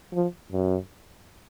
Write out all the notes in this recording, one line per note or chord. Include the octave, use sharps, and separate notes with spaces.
F3
F#2